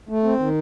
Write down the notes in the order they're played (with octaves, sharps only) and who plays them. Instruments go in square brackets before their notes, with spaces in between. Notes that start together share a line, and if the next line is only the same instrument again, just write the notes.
[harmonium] A3
C4
D#3